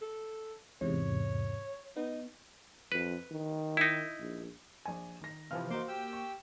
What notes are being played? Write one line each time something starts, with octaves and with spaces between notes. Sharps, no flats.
A4
E2 G#2 C3 C#5
B3 D#4
F2 B4
D#3
D#4 E4
A#1
A#1 G#5
D#3 A#6
C3 E3 F3 F5 F6
A#3 D#4 F#4 A#4 C5 C6 D6
G4 G5 E6
C#6